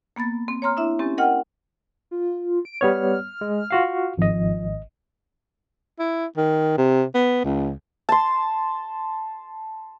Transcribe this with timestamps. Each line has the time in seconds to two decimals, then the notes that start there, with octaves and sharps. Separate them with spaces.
0.16 A#3 B3 B5 A6
0.48 C4
0.62 C#5 A#5 C6 F6
0.77 D4 E4 E5
0.99 C4 C#4 G4 G#5 A6
1.18 A#4 D#5 F#5 G5 F6
2.11 F4
2.65 D7
2.81 G3 B3 C#5 F6
3.41 G#3
3.71 F4 F#4 F5
4.18 G#1 F3 D#5
5.99 E4
6.37 D#3
6.77 C3
7.15 B3
7.44 C#2
8.09 A5 C6